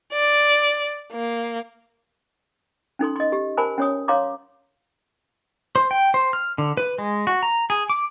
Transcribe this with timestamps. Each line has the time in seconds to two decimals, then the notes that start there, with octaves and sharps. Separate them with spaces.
0.12 D5
1.13 A#3
2.99 C#4 D#4 A4 C6
3.16 D#5 C6
3.32 G4
3.57 A#4 C5 G#5 A5 B5
3.78 C#4 C#5 D#6
4.08 C#5 F5 A#5 C6 D6
5.76 C5
5.91 G5
6.14 C5
6.33 F6
6.58 D3
6.77 B4
6.98 G#3
7.27 F#4
7.43 A#5
7.70 G#4
7.90 D6